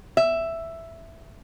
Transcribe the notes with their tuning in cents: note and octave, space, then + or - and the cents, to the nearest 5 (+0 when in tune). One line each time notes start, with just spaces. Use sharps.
E5 +5